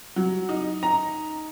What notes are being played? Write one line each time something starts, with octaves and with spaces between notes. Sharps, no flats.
F#3
D#4
A#5